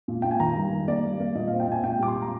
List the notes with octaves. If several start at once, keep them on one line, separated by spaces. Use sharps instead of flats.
A#2
A#2 G5
G#5
D#3 A#5
G2
D#3
A#3 D5
G2
A#3
A#2 D#5
C4 F5
G5
A#2 G#5
A#2 G5
G3 D6
C6
A#2
A#5